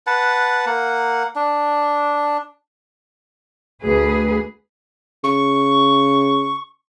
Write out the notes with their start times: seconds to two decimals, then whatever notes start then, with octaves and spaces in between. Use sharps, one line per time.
0.07 B4 F#5 A5
0.66 A#3 F#5
1.36 D4
3.81 D2 G#4 B4
5.24 C#3 C#6